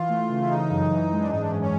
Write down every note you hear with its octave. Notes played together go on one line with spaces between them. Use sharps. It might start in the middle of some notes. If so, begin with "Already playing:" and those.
Already playing: E3 F4
A3
C#3
E4
C#3 D#4
F#2
E3
G#3
D4
G#2 D#4
D4
G#2 C#4
C#4